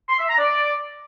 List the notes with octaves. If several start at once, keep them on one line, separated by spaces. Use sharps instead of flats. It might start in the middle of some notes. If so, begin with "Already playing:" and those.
C6
E5
A#5
D5